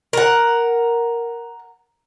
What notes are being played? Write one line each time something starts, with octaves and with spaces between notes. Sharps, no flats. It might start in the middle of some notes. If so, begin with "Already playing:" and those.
A#4 F#5